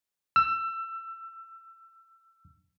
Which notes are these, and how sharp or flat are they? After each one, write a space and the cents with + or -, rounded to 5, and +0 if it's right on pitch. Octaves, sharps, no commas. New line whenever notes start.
E6 +25